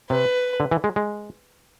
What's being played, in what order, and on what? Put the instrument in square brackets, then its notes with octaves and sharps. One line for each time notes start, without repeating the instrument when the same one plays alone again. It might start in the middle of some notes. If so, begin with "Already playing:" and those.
[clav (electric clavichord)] C3 [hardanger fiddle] B4
[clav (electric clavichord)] D3
E3
G#3
G#3